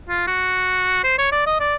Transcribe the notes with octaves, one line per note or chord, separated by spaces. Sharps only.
F4
F#4
C5
C#5
D5
D#5
D5